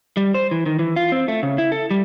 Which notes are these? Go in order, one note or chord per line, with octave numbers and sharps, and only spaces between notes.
G3
C5
E3
D#3
E3
F4
C4
A3
C#3
E4
A4
G3